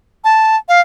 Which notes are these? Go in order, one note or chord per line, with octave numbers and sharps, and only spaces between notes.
A5
F5